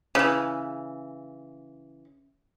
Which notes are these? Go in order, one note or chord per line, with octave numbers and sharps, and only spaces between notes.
C#3 E3